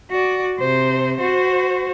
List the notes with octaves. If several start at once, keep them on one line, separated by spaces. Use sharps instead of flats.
F#4 D5
C3 C5
F#4 C5